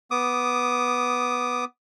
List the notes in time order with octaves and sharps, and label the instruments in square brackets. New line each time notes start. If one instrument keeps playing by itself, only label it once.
[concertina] B3 D6 D#6